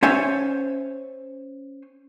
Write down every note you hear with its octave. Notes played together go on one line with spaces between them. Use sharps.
C#4 C5 C#5 E5 G#5